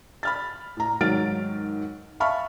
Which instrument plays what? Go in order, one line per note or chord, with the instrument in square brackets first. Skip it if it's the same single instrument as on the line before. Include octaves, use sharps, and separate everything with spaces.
[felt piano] B5 F6 A6
A2 A#5
G#2 D#3 F#3 F6 A6 D7
E5 F5 A5 B5 C#6 F6